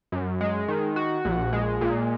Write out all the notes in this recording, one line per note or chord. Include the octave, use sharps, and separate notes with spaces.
F#2
G#3
D#3
F#4
A#1
G#3
A#2